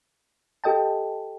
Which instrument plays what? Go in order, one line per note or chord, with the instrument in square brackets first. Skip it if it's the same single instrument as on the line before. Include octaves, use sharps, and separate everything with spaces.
[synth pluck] G4 A4 D#5 G5 A5